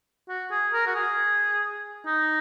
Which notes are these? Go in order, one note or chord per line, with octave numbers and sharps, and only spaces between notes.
F#4
G#4
A#4
F#4
G#4
D#4